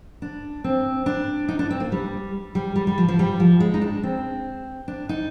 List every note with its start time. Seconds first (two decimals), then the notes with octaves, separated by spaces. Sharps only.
0.22 D4
0.64 C4
1.06 D4
1.48 D#4
1.59 D4
1.70 C4
1.80 A#3
1.92 G3
2.55 G3
2.76 G3
2.87 G3
2.98 F3
3.08 F3
3.19 G3
3.40 F3
3.60 G#3
3.74 D#4
3.82 D4
4.03 C4
4.88 D4
5.09 D#4